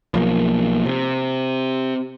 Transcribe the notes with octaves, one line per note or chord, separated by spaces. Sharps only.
B1 F3 A#3
C3